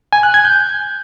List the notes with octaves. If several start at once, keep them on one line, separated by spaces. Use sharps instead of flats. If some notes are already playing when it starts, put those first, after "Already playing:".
G#5
F#6
G#6
G6